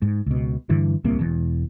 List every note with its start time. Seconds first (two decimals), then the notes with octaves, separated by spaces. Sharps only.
0.02 G#2
0.26 C#2 B2
0.70 G2 D3 E3
1.04 D1 C2 C3 A#3
1.19 E1 E2